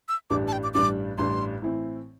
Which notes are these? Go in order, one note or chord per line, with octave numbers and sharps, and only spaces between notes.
E6
A1 G2 G3 D4 D6
A5
G5
D6
A1 G2 G3 D4 D6
A1 G2 G3 D4 C6
A2 E3 C4 E4